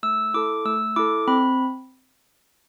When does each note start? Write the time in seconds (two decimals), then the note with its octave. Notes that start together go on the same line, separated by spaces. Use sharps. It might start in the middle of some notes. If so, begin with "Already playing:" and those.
0.03 A3 E6
0.34 E4 A4 D6
0.66 A3 E6
0.96 E4 A4 D6
1.28 C4 B5